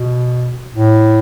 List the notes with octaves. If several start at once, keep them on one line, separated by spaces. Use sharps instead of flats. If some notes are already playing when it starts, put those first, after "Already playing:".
Already playing: B2
A2